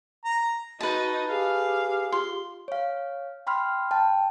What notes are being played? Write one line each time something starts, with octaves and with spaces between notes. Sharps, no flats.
A#5
D#4 F#4 B4 A5
G4 G#4 F5
F4 C6
C#5 F5
G5 B5 C6 F6
G5 A5